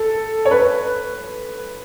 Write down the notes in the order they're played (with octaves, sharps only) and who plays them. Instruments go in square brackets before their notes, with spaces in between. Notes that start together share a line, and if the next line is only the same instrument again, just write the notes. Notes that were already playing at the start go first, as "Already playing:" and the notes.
Already playing: [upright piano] A4
C#5
B4